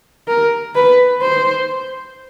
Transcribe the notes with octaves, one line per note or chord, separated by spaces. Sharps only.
A#4
B4
C5